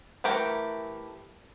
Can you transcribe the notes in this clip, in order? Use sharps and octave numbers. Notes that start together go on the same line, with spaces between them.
E3 A3 G4 A#4